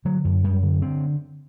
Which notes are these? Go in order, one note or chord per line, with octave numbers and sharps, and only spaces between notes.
D3 F#3
F#2
F#2 G3
D3
D3 C4